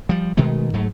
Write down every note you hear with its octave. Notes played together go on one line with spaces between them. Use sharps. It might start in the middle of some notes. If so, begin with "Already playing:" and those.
F3 G3
B2 D#3 G#3 A3
G#2 F#3 A3